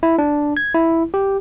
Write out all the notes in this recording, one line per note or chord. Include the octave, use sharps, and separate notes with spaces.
E4
D4
G#6
E4
G4